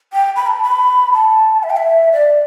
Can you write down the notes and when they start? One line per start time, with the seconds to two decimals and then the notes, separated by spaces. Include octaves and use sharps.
0.13 G5
0.36 B5
0.47 A5
0.63 B5
1.13 A5
1.63 E5
1.70 G5
1.77 E5
2.12 D5